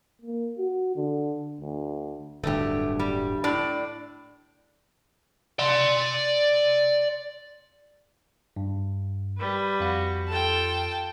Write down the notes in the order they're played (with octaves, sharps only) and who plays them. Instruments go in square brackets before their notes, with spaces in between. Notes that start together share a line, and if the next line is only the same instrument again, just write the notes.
[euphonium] A#3
F#4
D3
D2
[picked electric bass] D1 D2 G2 [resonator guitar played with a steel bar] A3 G4
[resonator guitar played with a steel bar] G3
A2 D4 D5
[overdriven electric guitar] D5 C6
[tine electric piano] G2
[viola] G3 B4
[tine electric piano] F2 F5 [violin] F#4
[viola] F4 A4 [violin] G5 A5